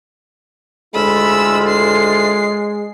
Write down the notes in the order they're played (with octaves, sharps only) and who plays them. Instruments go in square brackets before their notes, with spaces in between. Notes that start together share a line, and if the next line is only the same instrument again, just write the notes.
[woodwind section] D2 A2 F4 [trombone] G#3 [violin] B5 E6
[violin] C7